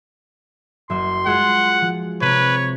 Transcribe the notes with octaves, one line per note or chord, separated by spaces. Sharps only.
F#1 E5 C6
G#3 F4 F#5 E6
F3
C3 B4 C#5